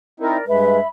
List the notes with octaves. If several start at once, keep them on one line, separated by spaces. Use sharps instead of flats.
C4 D#4 E4 A#4 D5
G2 G#3 B4 E5 B5